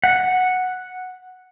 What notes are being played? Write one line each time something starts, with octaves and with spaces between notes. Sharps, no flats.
F#5